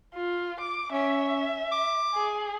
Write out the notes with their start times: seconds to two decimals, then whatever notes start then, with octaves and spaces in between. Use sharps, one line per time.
0.14 F4
0.60 D6
0.92 C#4 E5
1.71 D6
2.14 G#4